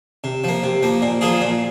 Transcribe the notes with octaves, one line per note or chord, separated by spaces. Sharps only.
C3
F3 A#3
C3
F3 A#3
A#2
F3 A#3 F4 G#4
A#2